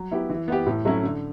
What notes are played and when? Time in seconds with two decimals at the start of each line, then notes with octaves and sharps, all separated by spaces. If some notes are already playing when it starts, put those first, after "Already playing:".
Already playing: F#3
0.11 B3 E4 G4
0.30 E3
0.48 B3 E4 G4
0.66 A2
0.85 F#3 A3 C#4 E4
1.03 D3